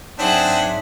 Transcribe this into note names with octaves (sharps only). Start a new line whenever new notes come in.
G#2 F#3 C4 D4 G#4 E5 F#5